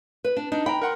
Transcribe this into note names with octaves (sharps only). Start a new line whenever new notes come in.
B4
D4
D4 D#4
G5 A#5 B5
A#4 F#5 C6